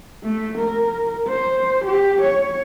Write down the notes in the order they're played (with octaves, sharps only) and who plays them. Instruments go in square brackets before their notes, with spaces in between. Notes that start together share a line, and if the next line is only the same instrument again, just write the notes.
[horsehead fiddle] A3
A#4
C5
G4
C#5